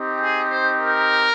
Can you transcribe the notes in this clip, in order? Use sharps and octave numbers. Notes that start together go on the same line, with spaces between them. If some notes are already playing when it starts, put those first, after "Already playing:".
Already playing: C4 D#4 G4
G#4
C5
A#4